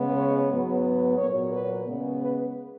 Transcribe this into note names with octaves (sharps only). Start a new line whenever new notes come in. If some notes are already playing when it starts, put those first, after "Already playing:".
Already playing: C#3 G#3 B3
C#5
G#2 F#3 B3
A#2 F#3 A#3 C#5
B4
C#3 G#3 B3
B4